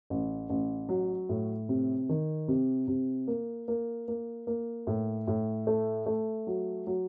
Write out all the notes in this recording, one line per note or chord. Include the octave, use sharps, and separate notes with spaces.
A1
A1
F#3
A2
C3
D#3
C3
C3
A#3
A#3
A#3
A#3
A2
A2
A3
A3
F#3
F#3